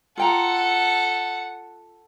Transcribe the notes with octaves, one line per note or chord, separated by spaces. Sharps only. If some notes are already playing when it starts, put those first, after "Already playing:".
F4 A4 F#5 G5 A#5